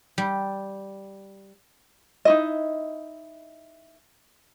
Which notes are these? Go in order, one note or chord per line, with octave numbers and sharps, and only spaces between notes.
G3
D#4 E4 D#5